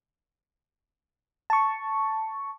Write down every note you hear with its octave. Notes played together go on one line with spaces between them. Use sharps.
A5 C#6